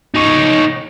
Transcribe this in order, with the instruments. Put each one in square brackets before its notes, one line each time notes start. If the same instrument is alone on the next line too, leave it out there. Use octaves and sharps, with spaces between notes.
[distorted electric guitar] D#4 C#5